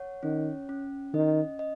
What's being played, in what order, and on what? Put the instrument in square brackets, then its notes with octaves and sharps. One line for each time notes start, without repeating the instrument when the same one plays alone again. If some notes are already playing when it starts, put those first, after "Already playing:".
Already playing: [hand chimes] C#5 F#5
[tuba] D#3 [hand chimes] C#4
[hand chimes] C#4
[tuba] D#3 [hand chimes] D#5
[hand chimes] D#5